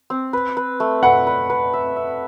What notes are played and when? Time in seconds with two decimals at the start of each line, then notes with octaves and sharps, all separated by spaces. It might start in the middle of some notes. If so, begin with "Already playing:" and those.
0.10 C4
0.33 B4
0.57 B4
0.80 A3
1.03 B4 F#5
1.27 B4
1.50 B4
1.73 E5
1.97 E5